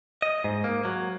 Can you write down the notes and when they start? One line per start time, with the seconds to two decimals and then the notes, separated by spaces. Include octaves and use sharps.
0.22 D#5
0.44 G#2
0.64 A#3
0.85 F#3